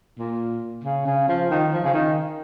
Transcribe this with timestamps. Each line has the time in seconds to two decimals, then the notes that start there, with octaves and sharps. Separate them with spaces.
0.18 A#2
0.84 C#3
1.06 C#3
1.28 F3
1.51 D#3
1.73 F3
1.84 C#3
1.94 D#3